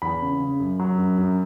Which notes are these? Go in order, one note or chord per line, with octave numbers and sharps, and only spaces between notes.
E2 B5
C#3
C#3
F#2
F#3
F#2
F#2